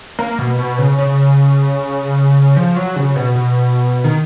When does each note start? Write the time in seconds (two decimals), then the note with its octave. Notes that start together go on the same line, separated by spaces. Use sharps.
0.19 A#3
0.39 B2
0.59 B2
0.78 C#3
0.98 C#3
2.57 F3
2.76 F#3
2.96 C#3
3.16 B2
3.36 B2
4.04 D#3